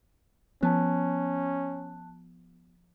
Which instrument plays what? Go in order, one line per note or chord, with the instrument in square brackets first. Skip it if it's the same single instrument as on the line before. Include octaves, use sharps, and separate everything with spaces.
[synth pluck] F3 [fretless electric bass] B3 [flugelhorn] C#4 [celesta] A5 F#6